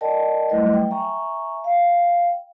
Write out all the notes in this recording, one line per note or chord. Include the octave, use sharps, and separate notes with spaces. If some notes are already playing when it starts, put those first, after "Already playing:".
A#4 D5 D#5 G5 A5
F#3 G3 A3 E4 B4 D#5
G5
E5 G#5 A#5 C#6
F5 G5